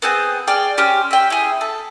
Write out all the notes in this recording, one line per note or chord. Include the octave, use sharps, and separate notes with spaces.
B3 C4 G#4 G6
G#4 D5 G5 F6
C#4 G4 C5
E5 G5
E4 G#4
A4